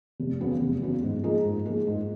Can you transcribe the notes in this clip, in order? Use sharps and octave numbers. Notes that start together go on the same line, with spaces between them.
F1
E2 C#3 F#3 B3
F1
E2 C#3 F#3 B3
G#2
F3 A#3 D#4 G#4
G#2
F3 A#3 D#4 G#4
G#2